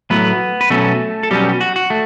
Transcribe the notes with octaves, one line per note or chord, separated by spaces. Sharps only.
A2 F#3 A3 B3 B4
B4
B2 F#3 A3 C#4 A4
A4
B2 F#3 G3 C#4 G4
F#4
F#4
A3